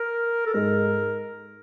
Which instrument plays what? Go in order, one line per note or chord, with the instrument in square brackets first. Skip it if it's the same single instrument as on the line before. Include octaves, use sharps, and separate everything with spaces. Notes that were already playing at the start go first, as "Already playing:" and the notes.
Already playing: [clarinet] A#4
A4
[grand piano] G#2 G#3 [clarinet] A#4